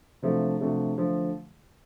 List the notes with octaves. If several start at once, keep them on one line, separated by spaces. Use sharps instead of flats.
C3 F3 A3 D4 F#4
C3 F3 A3 D4 F#4
D3 F3 A3